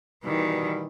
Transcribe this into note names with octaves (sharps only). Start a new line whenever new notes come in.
B2 D#3 E3 G3